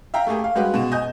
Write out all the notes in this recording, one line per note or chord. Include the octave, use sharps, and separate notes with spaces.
E5 F5 G5 A#5
A3 A#3 G4 G#4
F5
G3 G#3 F#4 G4 B4 F5
B2 G#3 F#4 E7
D#5 G#5 G6